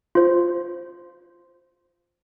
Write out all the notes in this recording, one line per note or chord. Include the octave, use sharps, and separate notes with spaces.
F4 C5